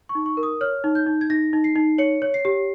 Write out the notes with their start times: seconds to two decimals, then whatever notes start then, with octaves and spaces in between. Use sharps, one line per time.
0.09 C#6
0.15 D#4
0.26 C#6
0.37 A#4
0.43 D#6
0.61 C#5 F6
0.84 D#4
0.95 G6
1.07 D#4
1.21 G#6
1.30 D#4 A#6
1.53 D#4
1.64 C7
1.76 D#4
1.99 C#5 C#7
2.22 C#5
2.34 C7
2.45 G4